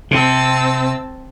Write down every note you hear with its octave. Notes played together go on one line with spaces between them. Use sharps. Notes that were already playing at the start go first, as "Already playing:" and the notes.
C3 C4 A5 E6